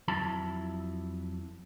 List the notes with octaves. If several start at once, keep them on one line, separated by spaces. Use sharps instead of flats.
F2 F#3 E4 A5